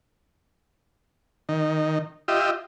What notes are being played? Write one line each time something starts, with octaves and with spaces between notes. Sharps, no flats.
D#3
F4 G4 D#5 E5